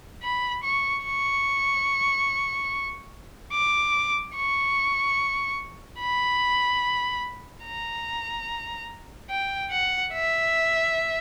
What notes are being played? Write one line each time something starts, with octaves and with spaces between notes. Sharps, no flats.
B5
C#6
C#6
D6
C#6
B5
A#5
G5
F#5
E5